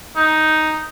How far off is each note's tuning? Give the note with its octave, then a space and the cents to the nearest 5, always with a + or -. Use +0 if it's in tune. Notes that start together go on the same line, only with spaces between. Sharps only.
D#4 +5